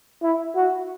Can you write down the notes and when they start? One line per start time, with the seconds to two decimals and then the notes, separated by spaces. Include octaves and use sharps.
0.22 E4
0.55 F#4